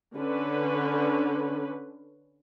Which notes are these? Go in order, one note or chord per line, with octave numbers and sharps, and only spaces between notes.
D3 C#4 B4